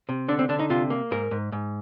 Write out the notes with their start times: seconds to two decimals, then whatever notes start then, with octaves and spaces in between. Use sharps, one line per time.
0.09 C3
0.28 D3 D4
0.39 C4
0.49 D3 D4
0.59 D#4
0.70 C3 F4
0.90 A#3
1.11 G#2 A#4
1.31 G#2
1.52 G#2